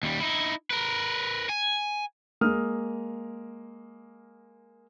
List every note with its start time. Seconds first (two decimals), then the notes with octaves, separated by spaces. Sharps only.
0.03 D#2 G3
0.20 D#4 E4
0.70 A#4 B4
1.49 G#5
2.41 G#3 A#3 D#6 F6